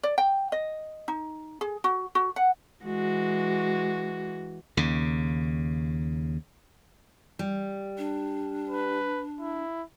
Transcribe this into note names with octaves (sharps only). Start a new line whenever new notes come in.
D5
G5
D#5
D#4
G#4
F#4
F#4
F#5
E3 G#3 F#4
D#2 C#3
G3
D4
B4
E4